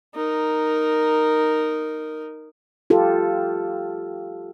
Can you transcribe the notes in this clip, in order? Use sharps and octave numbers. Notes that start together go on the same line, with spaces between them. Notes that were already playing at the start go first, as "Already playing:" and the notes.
D#4 A#4
F4 G4 A4